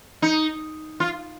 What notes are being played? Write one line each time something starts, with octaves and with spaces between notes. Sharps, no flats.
D#4
F4